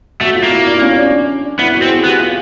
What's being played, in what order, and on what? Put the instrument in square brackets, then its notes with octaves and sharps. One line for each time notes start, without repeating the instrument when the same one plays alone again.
[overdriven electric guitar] A3 [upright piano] F#4
[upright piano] F4
[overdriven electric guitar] A#3
[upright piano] E4
D4
C#4
D4
[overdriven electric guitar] B3 [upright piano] E4
[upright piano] F#4
[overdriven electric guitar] C4
[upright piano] G#4
[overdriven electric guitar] B3 [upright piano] G4
[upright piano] F4